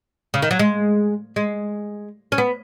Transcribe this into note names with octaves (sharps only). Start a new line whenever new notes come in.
C#3
D#3
F#3
G#3
G#3
C#4
B3